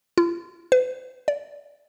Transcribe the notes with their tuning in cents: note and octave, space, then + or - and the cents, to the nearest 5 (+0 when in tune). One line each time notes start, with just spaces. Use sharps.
F4 -40
B4 +35
D5 -25